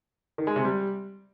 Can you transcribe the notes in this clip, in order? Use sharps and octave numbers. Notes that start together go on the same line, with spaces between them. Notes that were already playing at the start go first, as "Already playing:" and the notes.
D#3
G#3
C3
G3